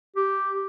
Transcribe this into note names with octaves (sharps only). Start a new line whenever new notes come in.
G4